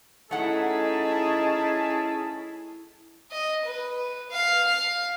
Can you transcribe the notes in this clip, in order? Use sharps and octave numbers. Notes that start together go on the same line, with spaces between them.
A3 C#4 D#4 E4 G#4 F#5 A5
D#5
B4
F5
F5